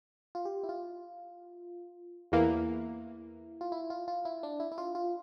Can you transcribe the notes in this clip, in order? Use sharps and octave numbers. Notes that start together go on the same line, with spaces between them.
F4
G4
E4
F4
E2 E3 A#3 E4
F4
E4
F4
F4
E4
D4
E4
E4
F4
F4